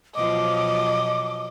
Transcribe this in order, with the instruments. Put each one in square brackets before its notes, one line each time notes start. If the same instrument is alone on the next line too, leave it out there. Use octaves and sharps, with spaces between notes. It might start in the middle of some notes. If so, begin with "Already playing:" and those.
[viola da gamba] B2 F3 F#3 [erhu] D#5 [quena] D6